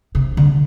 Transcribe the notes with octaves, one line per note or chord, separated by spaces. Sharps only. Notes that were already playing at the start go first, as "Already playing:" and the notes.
C3
D3